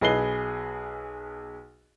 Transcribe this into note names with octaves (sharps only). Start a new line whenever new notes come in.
B1 G#4 B4 D#5 C7 G7